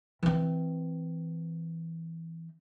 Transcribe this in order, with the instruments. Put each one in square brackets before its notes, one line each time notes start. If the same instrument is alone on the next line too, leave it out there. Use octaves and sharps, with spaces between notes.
[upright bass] E3 C4